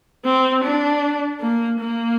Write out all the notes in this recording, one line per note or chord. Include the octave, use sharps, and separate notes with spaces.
C4
D4
A#3
A#3